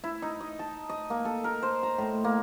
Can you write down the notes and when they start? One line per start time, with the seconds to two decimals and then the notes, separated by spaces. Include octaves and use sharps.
0.04 E4
0.22 D#4
0.40 D#5
0.59 A5
0.90 D#5
1.10 A#3
1.25 A4
1.44 A#4
1.63 C5
1.83 A#5
1.98 A2
2.24 A#3